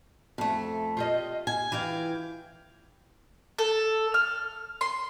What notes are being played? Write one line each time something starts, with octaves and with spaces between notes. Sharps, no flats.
F2 A3
F4 G4 D#5
G#5
E3 F5 G5
A4
F6
C6